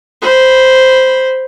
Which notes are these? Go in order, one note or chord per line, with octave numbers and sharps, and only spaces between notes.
C5 B5